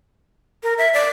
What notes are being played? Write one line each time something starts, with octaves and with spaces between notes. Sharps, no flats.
A#4
E5
D5